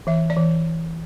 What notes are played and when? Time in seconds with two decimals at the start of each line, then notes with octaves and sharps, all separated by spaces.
0.07 E3 E5
0.30 D5
0.37 E3